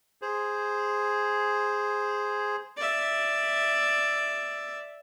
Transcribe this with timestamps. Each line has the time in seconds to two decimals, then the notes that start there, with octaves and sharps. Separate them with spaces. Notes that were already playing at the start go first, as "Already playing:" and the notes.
0.22 G#4 C5
2.77 D5 E5